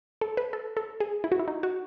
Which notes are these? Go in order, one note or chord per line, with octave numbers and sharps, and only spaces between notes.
A4
B4
A4
A4
G#4
E4
F#4
E4
D#4
F#4